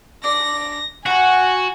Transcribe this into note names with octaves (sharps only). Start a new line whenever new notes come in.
D4 D5 A#6
F#4 F#5 G#5 C#6